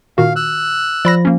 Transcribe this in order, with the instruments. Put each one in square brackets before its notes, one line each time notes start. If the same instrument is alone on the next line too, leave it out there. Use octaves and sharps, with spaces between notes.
[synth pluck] A#2 D#3 F#4 [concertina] F5
[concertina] E6 F#6
[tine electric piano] F3 [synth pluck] D5 B5 A#6
[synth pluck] A#3 C#4